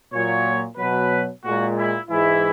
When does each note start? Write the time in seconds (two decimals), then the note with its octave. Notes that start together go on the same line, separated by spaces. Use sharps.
0.13 A#2 F#3 C#5
0.78 B2 F#3 B4
1.43 A#2 G#3 F#4
1.76 E4
2.09 G#2 E3 G#3 E4